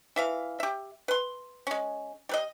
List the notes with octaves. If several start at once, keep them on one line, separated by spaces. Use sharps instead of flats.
E3 E5 F5
G4 E5
B4 C6
G#3 C#4
G3 B4 D#5